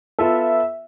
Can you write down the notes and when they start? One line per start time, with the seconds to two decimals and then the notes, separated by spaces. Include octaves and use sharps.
0.19 B3 F4 A4 E5